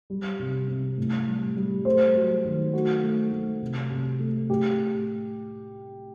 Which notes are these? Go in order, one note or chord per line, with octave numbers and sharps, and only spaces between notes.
G3
C3
C3
A2
G3
G3
A3 C5
F#3
D#3
A3 F#4
A3
A3
C3
C3
A3
A2 G4